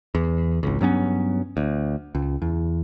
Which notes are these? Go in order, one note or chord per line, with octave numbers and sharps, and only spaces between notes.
E2
G#1 C#2
G2 F#3 B3 C#4
D2
C#2
E2